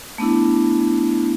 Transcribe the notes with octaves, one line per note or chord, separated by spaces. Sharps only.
A3 B3 D4 E4